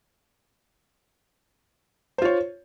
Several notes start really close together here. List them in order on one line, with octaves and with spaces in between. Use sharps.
C5 F4 C#5